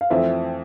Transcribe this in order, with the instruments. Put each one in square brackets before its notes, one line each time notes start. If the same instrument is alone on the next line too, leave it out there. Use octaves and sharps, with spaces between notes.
[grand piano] F5
[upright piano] F2 E3 A3 C4 [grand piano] C5 E5